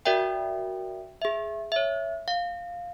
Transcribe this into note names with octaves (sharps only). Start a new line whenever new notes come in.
F#4 A#4 D5 E5 G5
G#4 E5
C#5 E5
F5